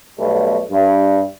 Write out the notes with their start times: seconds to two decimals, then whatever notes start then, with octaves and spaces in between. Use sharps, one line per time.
0.19 B1 B2 G3 A3
0.70 G2